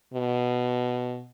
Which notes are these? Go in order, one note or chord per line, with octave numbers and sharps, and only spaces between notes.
B2